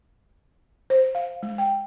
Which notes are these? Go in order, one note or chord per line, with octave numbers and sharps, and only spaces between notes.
C5
F5
G#3
G5